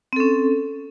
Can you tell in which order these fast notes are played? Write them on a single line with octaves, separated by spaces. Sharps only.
C4 A4 C#4